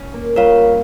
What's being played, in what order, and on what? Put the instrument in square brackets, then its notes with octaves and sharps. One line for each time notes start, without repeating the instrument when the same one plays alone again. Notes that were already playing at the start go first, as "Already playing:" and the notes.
Already playing: [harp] C#4
A#3
[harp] G3 [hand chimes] F4 A#4 C#5 F5